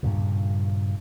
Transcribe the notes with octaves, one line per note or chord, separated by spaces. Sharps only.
G2 A#2 C#3